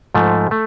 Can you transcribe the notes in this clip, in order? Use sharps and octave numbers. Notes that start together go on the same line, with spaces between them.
G#2 F3 A3
A3